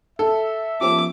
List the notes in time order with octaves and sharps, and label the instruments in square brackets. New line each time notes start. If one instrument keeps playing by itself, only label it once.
[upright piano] A4 [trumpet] E5
[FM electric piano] F3 C#4 G4 [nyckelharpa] D6